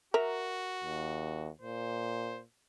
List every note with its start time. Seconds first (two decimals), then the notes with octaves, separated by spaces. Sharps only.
0.14 F#4 A#4 E5 A#5
0.83 D#2
1.61 A#2 C5